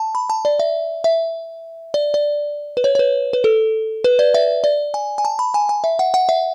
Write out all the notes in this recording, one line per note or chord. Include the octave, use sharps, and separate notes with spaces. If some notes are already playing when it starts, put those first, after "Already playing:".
Already playing: A5
B5
A5
D5
E5
E5
D5
D5
B4
C#5
C#5
B4
B4
A4
B4
D5
E5
D5
G#5
G#5
A5
B5
G#5
G#5
E5
F#5
F#5
E5